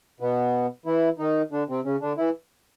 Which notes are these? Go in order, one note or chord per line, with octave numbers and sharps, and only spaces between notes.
B2 B3
E3 E4
D#3 D#4
D3 D4
C3 C4
C#3 C#4
D3 D4
E3 E4